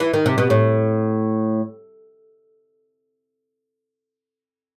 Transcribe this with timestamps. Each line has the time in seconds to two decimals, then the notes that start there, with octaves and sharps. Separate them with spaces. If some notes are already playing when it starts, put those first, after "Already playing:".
0.00 E3
0.14 D#3
0.26 C3
0.38 B2
0.50 A2